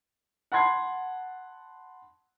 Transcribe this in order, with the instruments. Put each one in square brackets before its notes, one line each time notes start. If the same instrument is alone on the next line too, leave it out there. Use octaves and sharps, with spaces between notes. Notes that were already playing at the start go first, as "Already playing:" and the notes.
[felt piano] F#5 A5 B5 C6 G#6 C7